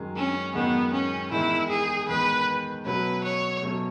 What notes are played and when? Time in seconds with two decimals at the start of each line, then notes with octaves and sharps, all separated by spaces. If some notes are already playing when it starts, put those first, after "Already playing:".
Already playing: F#2 D#3 G#3
0.17 C#4
0.55 F#2 D#3 G#3 B3
0.93 C#4
1.31 E2 D#3 G#3 E4
1.70 G#4
2.09 E2 D#3 G#3 B4
2.85 B2 F#3 A3 C#4 B4
3.24 C#5
3.62 B2 F#3 A3 C#4